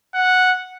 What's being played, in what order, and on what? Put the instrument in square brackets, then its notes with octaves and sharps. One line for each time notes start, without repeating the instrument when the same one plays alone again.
[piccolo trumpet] F#5